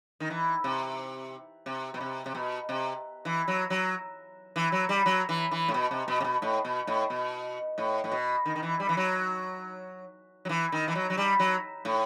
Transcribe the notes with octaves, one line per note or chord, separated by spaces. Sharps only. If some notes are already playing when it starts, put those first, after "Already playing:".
D#3
E3
C3
C3
B2
C3
C3
B2
C3
E3
F#3
F#3
E3
F#3
G3
F#3
E3
E3
A2
B2
C3
B2
C3
B2
A2
B2
A2
B2
A2
A2
B2
D#3
D#3
E3
G3
E3
F#3
F#3
E3
D#3
E3
F#3
F#3
G3
F#3
A2